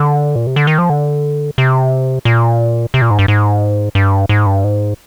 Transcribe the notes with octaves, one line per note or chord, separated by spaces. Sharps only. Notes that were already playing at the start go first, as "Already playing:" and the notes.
Already playing: D3
A#2
C3
D3
D#3
F3
D3
C3
A#2
C3
A#2
G#2
G2
G#2
G2
G#2
G2
G#2